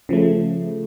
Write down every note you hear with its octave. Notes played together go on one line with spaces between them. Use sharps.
C#3 F3 A3